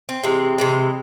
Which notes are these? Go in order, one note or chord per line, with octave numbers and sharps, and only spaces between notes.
C4
C3 E3 G#3
C3 E3 G#3